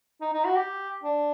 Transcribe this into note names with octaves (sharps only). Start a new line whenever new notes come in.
D#4
D#4
F#4
G4
D4